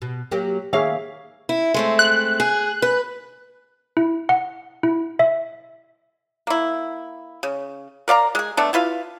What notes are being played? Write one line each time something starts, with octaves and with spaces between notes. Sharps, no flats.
B2
F#3 A#3 G4
D#3 A#3 G#4 C#5 E5 F5
E4
G#3 A3 C4
F#6
G#4
B4
E4
F#5
E4
E5
A#3 E4
C#3
A#4 D5 F5 A#5
G#3 G#4
A3 B3 D4 A4
E4 F4 B4 F5